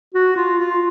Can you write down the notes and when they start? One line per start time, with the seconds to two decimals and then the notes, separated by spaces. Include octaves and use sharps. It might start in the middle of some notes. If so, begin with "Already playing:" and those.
0.14 F#4
0.36 F4
0.60 F4